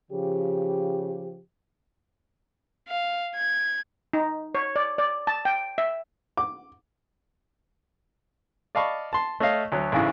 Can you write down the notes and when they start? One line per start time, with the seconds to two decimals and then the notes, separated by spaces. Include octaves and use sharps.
0.11 C#3 F3 G4
2.89 F5
3.35 G#6
4.13 D#4
4.55 C#5
4.76 D5
4.98 D5
5.27 A5
5.45 G5
5.78 E5
6.37 D6
8.75 D5 D#5 F5 A5 B5 C#6
9.13 A5 C6
9.40 A3 C#5 D#5 F5
9.72 D2 F#3
9.92 A1 G#2 C#3 E3